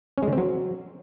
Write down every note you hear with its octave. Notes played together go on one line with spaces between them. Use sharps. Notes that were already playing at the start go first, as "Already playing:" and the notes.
C#4
G#3
D3
C4
F#3